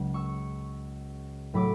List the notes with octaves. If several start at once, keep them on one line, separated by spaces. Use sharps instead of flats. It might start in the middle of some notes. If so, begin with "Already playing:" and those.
Already playing: C#2 C#3 F#3
C#6 E6
A2 F#3 B5 D6